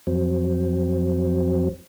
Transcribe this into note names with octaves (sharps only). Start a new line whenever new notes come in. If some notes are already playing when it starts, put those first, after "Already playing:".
F2 F#3 C4